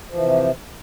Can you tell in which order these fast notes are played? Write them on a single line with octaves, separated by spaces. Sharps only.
F3 E3 C3